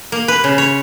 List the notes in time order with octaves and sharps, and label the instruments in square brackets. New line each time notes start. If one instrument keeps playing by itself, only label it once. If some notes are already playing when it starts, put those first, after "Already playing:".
[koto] A#3
B4
C#3
C#5